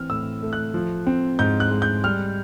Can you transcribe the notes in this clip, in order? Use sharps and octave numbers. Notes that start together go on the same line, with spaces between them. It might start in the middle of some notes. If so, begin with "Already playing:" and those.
Already playing: E3 C4 F6
A2 E6
A3
F#6
F3
C4
G#2 G6
F#6
G#3
G6
G3 F6